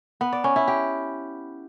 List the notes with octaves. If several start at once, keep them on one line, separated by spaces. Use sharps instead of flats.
B3
D5
C#4
E4
G4